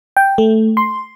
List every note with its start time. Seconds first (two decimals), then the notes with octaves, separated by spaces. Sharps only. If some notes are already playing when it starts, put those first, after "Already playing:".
0.17 G5
0.38 A3
0.77 C6